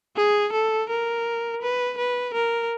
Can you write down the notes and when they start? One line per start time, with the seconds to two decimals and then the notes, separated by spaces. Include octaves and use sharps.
0.16 G#4
0.53 A4
0.89 A#4
1.62 B4
1.98 B4
2.34 A#4